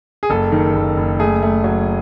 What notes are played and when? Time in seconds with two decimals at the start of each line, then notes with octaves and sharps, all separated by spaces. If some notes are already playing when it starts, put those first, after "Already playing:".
0.23 G#4
0.30 F#1 A4
0.52 D#3
0.75 F#1
0.97 F#1
1.19 A3 G#4
1.43 A3
1.64 F#3